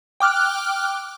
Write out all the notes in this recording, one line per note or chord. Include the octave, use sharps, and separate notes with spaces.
G5 D6 F6 F#6